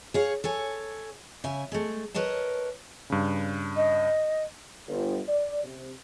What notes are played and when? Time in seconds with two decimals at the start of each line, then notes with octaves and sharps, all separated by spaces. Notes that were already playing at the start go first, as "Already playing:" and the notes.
0.14 G#4 C#5 F5
0.44 A4 C#5 G#5
1.44 C#3 E5 G#5
1.72 G#3 A3
2.14 A#4 B4 C#5 D#5 A5
3.10 G2 C#3
3.76 D#5
4.88 G1
5.28 D5
5.64 C3